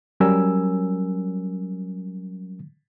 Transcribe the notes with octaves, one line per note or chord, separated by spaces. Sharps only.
F#3 G3 C#4 A#4 G#5 E6